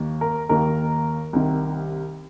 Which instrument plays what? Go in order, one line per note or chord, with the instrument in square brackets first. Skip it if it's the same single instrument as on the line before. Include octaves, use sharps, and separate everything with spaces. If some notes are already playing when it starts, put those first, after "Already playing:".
Already playing: [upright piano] D#2 D#3 A#3
A#4
D#2 D#3 A#3 A#4
C2 C3 D#3